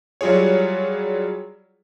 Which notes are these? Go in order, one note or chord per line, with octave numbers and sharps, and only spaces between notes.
F#3 G3 F4 G#4 C#5